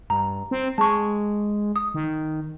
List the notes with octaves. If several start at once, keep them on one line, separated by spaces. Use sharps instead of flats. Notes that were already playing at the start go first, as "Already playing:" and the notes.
G2 A#5
C4
G#3 A5 C#6
D#6
D#3